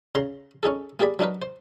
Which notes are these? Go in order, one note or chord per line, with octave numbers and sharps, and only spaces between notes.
C#3 A#5 C6
C#4 D#4 G#4 A4
A#3 G4 G#4 D5 B5
F#3 D4 D#4 A#4 B4
C5